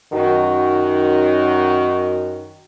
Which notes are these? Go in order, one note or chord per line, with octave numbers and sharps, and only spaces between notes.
F#2 D#3 F#4